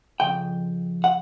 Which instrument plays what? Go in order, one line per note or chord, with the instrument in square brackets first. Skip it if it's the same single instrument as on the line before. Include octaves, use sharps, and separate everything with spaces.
[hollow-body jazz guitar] F2 C#3 G5
F#5